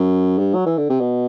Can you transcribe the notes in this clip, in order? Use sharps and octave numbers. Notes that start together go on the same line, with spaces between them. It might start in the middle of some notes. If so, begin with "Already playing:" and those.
Already playing: F#2
G2
F#3
E3
D3
C3
B2